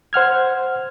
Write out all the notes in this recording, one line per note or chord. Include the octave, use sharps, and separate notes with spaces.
C5 F#5 F6 G#6